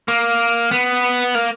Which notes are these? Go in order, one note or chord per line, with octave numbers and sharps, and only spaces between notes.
A#3
B3
A#3